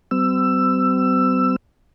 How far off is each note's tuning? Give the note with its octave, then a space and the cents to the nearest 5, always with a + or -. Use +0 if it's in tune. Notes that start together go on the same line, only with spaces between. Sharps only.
G3 -45 C4 -40 E6 +15